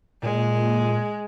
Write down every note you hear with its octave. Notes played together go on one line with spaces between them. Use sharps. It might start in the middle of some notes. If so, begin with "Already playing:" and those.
A#2 G#3